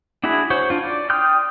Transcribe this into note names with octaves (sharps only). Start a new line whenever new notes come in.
D4 E4 F#4 G#4 B5
F#4 C5 C#5
D4 F4
D5
G5 C6 D#6 F6 G6